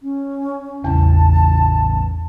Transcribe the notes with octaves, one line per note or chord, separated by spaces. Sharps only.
C#4
A1 E2 C#3 A5